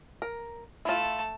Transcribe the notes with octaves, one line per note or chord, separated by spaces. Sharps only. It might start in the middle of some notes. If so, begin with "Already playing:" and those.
A#4
A3 E4 F4 A5